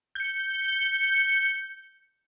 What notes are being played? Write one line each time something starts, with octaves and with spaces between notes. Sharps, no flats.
G6 C#7